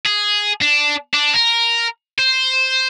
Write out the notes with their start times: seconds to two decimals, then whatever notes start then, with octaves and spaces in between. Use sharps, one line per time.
0.06 G#4
0.62 D4
1.14 D4
1.34 A#4
2.19 C5